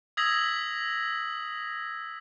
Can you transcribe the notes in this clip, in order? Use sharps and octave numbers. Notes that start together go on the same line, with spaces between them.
D#6 E6 G#6 A#6 B6 F#7